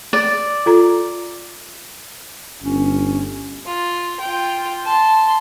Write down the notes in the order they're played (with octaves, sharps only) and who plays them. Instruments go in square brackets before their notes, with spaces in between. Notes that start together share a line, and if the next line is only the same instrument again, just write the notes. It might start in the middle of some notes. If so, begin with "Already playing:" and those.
[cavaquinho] D5
[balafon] F4 A4 A#5
[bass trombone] G1 [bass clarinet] C#4
[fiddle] F4
F4 G5
A5 C6